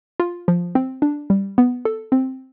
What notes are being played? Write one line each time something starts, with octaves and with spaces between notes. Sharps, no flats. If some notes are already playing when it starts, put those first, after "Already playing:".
F4
F3
C4
D4
G3
B3
A4
C4